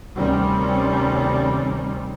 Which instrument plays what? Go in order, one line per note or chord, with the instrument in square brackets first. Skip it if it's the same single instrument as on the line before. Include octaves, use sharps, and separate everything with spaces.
[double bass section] D2 C3 D#3 G3 C4 C#4